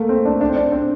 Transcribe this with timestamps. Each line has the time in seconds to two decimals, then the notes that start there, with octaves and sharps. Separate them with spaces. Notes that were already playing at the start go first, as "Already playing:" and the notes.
Already playing: A3 A#3
0.09 C4
0.25 D4
0.41 D4
0.49 C4
0.57 D4
0.72 C4